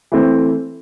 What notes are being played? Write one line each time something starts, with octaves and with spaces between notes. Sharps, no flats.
E3 A3 C4